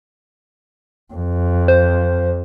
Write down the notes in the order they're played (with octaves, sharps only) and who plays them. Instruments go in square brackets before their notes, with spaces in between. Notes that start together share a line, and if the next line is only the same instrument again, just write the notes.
[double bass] F2
[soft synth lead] C5